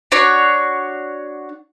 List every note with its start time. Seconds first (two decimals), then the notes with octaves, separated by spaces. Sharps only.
0.12 D4 F#4 C#5